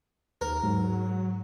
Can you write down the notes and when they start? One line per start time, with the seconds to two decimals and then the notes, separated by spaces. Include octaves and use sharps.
0.41 D#2 A#4
0.63 G#2 F#3